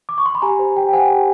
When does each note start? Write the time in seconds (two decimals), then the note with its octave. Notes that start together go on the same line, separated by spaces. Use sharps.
0.09 D6
0.18 C#6
0.26 C6
0.35 B5
0.42 G4 G#5 A#5
0.59 C5
0.76 G4 G5
0.88 G5
0.93 C5 F#5 G#5
1.10 G4